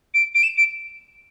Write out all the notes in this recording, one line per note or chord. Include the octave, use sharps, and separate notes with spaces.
D7
D7
E7
D7